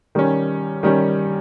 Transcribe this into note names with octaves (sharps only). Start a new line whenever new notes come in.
D#3 G3 C#4
D#3 G3 C#4